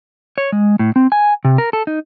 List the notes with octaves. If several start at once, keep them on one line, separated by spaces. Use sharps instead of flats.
C#5
G#3
A2
C4
G#5
C3
A#4
A4
D#4